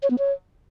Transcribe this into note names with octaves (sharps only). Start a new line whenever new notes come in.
C#5
B3
C#5